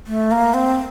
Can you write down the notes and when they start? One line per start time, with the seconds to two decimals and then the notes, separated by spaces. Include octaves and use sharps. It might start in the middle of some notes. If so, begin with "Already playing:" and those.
0.07 A3
0.31 A#3
0.54 C4